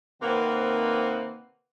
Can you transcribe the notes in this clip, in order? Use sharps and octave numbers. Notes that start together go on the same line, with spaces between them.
C3 D#3 A#3 C4 B4 F#5